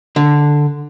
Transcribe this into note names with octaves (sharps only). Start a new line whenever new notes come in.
D3